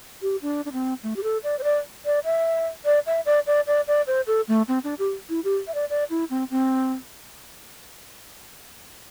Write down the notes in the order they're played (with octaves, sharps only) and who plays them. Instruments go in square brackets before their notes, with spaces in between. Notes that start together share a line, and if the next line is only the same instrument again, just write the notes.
[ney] G4
D4
D4
C4
A3
G4
A4
D5
C5
D5
D5
E5
D5
E5
D5
D5
D5
D5
C5
A4
A3
C4
D4
G4
E4
G4
E5
D5
D5
E4
C4
C4